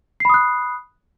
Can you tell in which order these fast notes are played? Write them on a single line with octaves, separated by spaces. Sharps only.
C7 B5 D#6 F#6